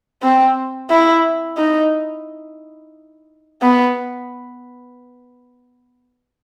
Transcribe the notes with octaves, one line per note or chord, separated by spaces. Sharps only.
C4
E4
D#4
B3